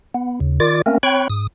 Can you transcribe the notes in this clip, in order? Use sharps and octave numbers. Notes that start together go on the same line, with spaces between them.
B3
D#2 C#3
D#3 F4 D5 D6 A6
A3 A#3 C4 C#4 A#4
C4 C#5 G5 B5 C#6 F#6
G#2 D#6